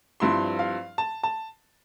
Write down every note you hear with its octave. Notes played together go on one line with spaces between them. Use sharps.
G2 F3 C4 E4 C6
F5
A5
A5